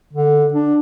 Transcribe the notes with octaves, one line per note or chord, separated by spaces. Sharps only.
D3
D4